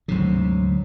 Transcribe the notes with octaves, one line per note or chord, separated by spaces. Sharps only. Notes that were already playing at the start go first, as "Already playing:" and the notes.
D2 G#2 C3 F#3